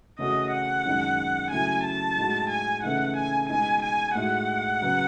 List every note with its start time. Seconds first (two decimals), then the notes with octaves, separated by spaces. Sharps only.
0.19 C#3 E3 A3 C#4 F#4 D#5
0.51 F#5
0.85 F#2 D#3 G#3 D#4
1.51 C#3 F#3 A3 E4 G#5
1.84 A5
2.17 A2 G#3 D#4 F#4
2.50 G#5
2.83 C#3 E3 A3 D#4 F#5
3.16 G#5
3.49 B2 G#3 D#4 G#5
3.83 G#5
4.15 A2 G#3 D#4 F#4 F#5
4.82 C#3 F#3 B3 F#4